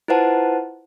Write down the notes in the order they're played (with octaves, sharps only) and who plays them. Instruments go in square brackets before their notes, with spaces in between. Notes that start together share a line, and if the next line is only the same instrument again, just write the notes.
[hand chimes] E4 F4 B4 C5 F#5 A5